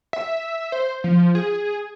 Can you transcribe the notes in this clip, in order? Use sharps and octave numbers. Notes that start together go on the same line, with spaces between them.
E5
C5
F3
G#4